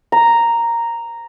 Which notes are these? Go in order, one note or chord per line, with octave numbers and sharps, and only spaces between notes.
A#5